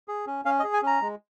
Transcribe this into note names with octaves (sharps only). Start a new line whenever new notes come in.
G#4
C#4
C#4 F5
D#5
G#4
G#5
C#4 A#5
G#3